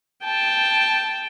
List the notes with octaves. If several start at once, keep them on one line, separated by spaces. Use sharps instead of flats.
G5 A5